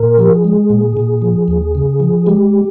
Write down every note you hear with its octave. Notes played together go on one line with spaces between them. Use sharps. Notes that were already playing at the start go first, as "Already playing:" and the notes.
Already playing: A#2 A#4
F3 G4
G#4
G#3
A#2
A#2
F3
D#2
C#3
F3
G#3 G4